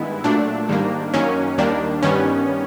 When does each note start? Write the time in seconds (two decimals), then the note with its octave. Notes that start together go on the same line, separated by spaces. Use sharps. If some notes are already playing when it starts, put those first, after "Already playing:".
Already playing: G2 D#3 G#3 B3 E4
0.24 A#2 F#3 A3 D4
0.69 G#2 D#3 G3 A#3
1.14 F#2 D#3 F#3 A#3 C#4
1.58 D#2 D#3 G3 A#3 D4
2.03 G2 D#3 G3 B3 C#4